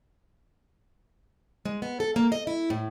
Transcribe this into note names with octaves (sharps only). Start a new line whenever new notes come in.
G#3
B3
A4
A#3
D#5
E4
A2